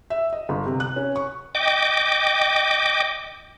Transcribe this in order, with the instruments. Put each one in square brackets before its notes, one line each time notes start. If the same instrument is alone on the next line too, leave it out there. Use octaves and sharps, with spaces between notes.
[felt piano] E5
D#5
G1
C3
F#6
C#4
C#6
[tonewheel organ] D#5 G5 D6